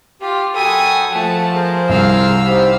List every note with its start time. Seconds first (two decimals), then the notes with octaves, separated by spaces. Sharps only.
0.21 F4 G4
0.55 F#2 F#4 A4 G5 G#5 B5 D#6
1.11 F3 A3 F#5 A5
1.54 G#4 A#4 C5
1.89 C2 F5 E6
2.45 D#4 G4 C5 B5